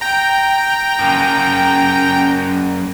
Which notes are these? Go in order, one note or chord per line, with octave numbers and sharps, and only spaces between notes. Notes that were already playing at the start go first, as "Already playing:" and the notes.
G5 A#5
F#2 A#3